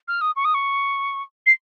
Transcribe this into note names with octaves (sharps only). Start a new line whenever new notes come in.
F6
D#6
C#6
D#6
C#6
C7